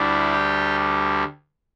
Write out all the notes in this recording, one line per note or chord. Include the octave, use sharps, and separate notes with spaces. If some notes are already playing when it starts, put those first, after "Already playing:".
Already playing: D2 D3 G3 E4
G4